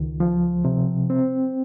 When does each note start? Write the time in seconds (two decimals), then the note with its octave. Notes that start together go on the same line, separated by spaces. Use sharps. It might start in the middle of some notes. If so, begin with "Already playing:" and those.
Already playing: C#2 D#3
0.20 F3
0.65 C3
1.10 C4